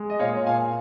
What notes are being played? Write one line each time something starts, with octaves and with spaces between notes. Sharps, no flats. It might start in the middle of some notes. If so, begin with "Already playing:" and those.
Already playing: G#3
D#5
A#2 C#5 F5
A#2 F5 G#5